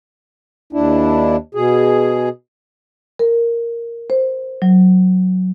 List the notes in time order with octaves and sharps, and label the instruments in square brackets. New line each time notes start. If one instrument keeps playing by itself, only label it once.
[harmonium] D#2 D4 E4
B2 G#4
[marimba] A#4
C5
F#3